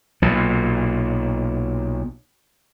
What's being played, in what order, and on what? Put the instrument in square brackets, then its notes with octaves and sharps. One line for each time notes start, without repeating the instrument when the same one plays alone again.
[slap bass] B1 A#2